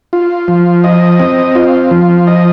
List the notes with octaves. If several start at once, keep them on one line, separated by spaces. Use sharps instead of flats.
F4
F3
D#5
C4
F4
F3
D#5